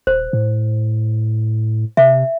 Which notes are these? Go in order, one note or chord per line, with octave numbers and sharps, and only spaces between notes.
D#1 C5
A2
C3 E5